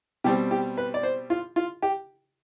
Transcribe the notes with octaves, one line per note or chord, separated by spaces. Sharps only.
B2 G3 C4 G4
G4
B4
D5
C5
F4
F4
G4